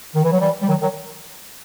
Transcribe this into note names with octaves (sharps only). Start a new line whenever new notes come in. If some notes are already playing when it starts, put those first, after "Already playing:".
D#3
E3
F#3
E3 G3
G3
D#3 F#3
D#3 F#3